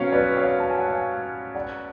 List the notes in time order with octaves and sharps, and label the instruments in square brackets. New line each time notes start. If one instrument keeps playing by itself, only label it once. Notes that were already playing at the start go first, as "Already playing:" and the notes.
Already playing: [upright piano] B2 F#3 C#4 [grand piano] C#5 F5
[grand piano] B4 D5
C#5 F5
A5
G#5
F#5
F5 G#5
D5 F#5